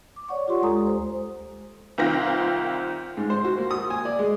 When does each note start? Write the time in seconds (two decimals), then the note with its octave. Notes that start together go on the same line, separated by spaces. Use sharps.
0.16 D6
0.29 C#5 D5 F#5 C#6
0.48 F4 G4 C6
0.62 D2 G#3 A4 G#5 A#5 D#6
0.87 C5
1.98 C2 D#3 C4 F4 G5 A#6
3.17 G#2
3.30 C5
3.44 F#4
3.58 A#3
3.71 D#6
3.90 G#5
4.05 D5
4.19 G#3